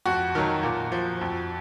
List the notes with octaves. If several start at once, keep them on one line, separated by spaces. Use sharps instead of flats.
F2 F#4
D#3 F#3
A#2
F3
F2